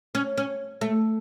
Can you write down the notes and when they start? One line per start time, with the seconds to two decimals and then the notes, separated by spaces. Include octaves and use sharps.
0.15 C#4
0.38 C#4
0.81 A3